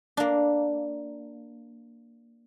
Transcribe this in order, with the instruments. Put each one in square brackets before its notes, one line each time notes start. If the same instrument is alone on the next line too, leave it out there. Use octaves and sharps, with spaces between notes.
[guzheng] A#3 D4